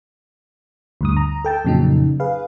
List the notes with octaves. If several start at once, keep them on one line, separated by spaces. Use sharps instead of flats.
D2 G2 D#6
A#5
A4 G5 A5
F2 A#2 C#3 F#3 D#4
G#4 B4 F5